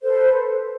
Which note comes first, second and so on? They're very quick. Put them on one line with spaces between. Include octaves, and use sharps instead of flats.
C5 A4 B4